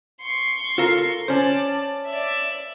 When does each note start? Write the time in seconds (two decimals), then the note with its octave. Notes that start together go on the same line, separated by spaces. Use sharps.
0.21 C6 C#6
0.78 F4 A4 A#4
1.28 C#4 C5 D5 A5
2.06 D5 E5